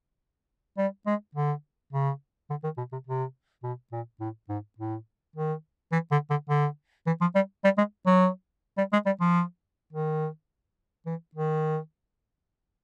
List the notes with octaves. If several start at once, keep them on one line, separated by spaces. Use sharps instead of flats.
G3
G#3
D3
C#3
D3
D#3
B2
C3
C3
B2
A#2
A2
G#2
A2
D#3
E3
D3
D3
D3
E3
F3
G3
G3
G#3
F#3
G3
G#3
G3
F3
D#3
E3
D#3